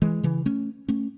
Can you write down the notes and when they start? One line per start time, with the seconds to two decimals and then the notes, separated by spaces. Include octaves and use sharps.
0.02 E3 G#3
0.23 C#3 E3
0.46 A3 C#4
0.88 A3 C#4